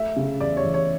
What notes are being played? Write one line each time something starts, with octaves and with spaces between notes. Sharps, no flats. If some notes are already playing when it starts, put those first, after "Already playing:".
Already playing: A3 E5
C#3
E2 D5
C#5
E2
C#5